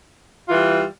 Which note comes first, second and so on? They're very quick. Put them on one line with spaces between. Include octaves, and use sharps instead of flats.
F4 E3 G3